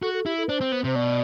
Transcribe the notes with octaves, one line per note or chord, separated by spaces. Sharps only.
F#4 A4
A4
E4 G4
A4
D4 C5
C4
B3
C3 C5
B2 D5